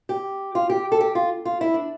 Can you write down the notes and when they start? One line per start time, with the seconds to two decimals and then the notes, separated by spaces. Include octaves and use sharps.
0.09 G4
0.55 F4
0.70 G4
0.92 A4
1.01 G4
1.15 F4
1.45 F4
1.61 E4
1.74 D4